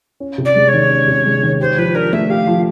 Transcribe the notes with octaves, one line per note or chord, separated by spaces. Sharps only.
C#4
C3
D5
G#3
C#5
D#3
C#4
C3
G#3
D#3
G4 C5
F3 B4
D4 A#4
A3 E5
G4 F5
F3